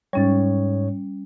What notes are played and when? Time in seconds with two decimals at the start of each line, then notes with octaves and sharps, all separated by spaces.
0.13 G#2 G3 C#4 C#5 A6